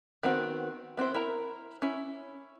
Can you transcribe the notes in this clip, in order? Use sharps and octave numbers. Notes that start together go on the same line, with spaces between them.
D#3 B3 C4 F#4
B3 C4 E4 C5
E4 A#4 A#5
C#4 E4